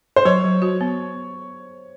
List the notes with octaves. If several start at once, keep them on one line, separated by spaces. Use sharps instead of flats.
C5
F#3 C#5
F#3
F#4
B3